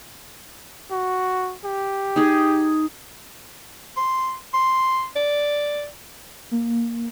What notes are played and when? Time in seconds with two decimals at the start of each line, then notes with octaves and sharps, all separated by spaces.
0.91 F#4
1.65 G4
2.16 D#4 G#4
3.97 C6
4.54 C6
5.16 D5
6.51 A#3